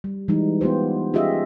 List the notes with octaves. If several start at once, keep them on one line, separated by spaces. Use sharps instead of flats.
G3
E3 G3 G#3 D#4
B3 F4 G4 C5
C#4 F4 G4 G#4 D#5 E5